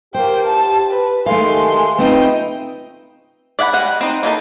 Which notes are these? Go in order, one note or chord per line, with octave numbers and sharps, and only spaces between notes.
A#3 G4 C5 G5
A5
B4
D#3 G#3 A3 G4 A4 F5 C6
C#3 A3 C4 D#4 F4 B4 D#5 G5
D5 E5 F#5 G#5 B5
G3 G#3 F#5
C4 D#4
A#3 B3 C#4 D#4 A4